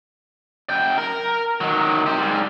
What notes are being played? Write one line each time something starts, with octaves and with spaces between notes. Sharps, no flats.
F#2 G5
A#4
D#3 F#3
G4 C5
G#2 G3